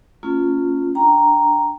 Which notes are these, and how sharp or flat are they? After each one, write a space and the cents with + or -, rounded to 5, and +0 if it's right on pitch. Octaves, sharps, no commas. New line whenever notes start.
A#3 -40 C#4 +0 F4 +0
D4 +0 G5 +0 A#5 +0